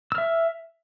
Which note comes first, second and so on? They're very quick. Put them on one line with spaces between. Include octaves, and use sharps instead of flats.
E6 F6 E5